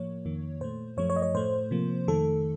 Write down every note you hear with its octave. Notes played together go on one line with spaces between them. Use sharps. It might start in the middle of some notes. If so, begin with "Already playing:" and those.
Already playing: A2 F3 A#3 C#5
F2 D#3 A#3
A#2 A3 C5
F#2 F3 A3 C#5
C#5
D#5
C#5
A2 A3 C5
C3 F3 A#3
F2 D#3 A3 A4